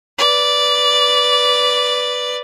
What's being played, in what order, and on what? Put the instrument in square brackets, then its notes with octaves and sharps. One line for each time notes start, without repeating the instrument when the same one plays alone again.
[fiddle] B4 D5